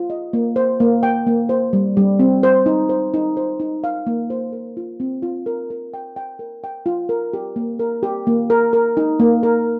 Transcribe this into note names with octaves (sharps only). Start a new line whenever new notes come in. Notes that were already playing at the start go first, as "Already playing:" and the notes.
Already playing: F4
D#5
A#3
C5
A#3
G5
A#3
C5
G3
G3
C4
C5
D#4
C5
D#4
C5
D#4
F5
A#3
C5
A#4
F4
C4
F4
A#4
A#4
G5
G5
A#4
G5
F4
A#4
G4
A#3
A#4
G4
A#3
A#4
A#4
D#4
A#3
A#4